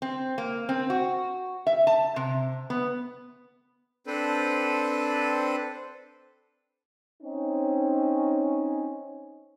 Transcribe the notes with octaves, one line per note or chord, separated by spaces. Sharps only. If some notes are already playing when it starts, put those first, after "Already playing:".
C4
A#3
C4
F#4
E5
A5
C3
B3
C4 D4 A4 B4 C5
C4 C#4 D#4